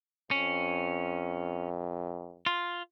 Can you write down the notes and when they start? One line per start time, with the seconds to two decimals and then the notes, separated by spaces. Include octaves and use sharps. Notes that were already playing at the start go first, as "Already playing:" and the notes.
0.31 F2 C#4
2.46 F4